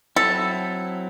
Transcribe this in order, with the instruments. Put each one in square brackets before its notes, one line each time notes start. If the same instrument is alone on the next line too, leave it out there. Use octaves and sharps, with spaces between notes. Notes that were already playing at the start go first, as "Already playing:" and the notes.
[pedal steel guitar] F#3 C4 E4 [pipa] A4